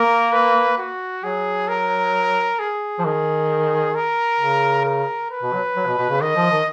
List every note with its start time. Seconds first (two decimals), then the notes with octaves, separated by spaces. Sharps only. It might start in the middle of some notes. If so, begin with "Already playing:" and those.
Already playing: A#3 A#4
0.33 B4
0.78 F#4
1.24 F#3 G#4
1.68 A#4
2.59 G#4
2.99 F3
3.05 D#3 G#4
3.95 A#4
4.40 C#3
4.86 A#4
5.31 B4
5.43 B2
5.54 F#3
5.76 F#3
5.87 B2
5.98 B2
6.10 C#3
6.21 D#3 D#5
6.36 F3
6.51 D#3